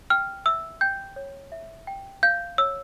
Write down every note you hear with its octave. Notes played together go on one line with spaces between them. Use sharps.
G5 F6
E5 E6
G5 G6
C#5
E5
G5
F5 G6
C#5 E6